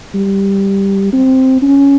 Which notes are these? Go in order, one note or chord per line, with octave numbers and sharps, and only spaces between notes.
G3
C4
C#4